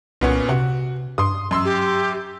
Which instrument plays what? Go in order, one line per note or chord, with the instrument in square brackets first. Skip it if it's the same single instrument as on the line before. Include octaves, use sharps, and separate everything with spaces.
[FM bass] C2 [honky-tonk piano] A#2 B3 C#4
[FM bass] C3 [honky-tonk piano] F#4
[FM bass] G2 [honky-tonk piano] C6 D#6
[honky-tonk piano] F#2 C6 E6
[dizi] G4